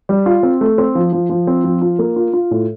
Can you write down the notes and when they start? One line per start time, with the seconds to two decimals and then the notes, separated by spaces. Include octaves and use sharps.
0.09 G3
0.26 F4
0.43 C4
0.61 A3
0.78 C4
0.95 F3
1.13 F3
1.30 F3
1.47 C4
1.64 F3
1.82 F4
1.99 A#3
2.16 F4
2.33 F4
2.51 A2